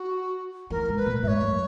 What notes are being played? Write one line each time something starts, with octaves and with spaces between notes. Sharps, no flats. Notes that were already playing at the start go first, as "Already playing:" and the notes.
Already playing: F#4
E3 A#4
G#2
B4
A#2
G#2 C#5 E5
F#2